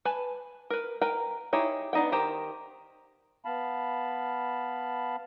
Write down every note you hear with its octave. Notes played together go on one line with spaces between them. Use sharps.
B4 G#5 A5 B5
A#4 B4
A#4 B4 G5 A#5
D#4 E4 G4 G#4 C#5
B3 D4 D#4 E5 G5
D#3 G4 C5 A#5
B3 F5 A5 B5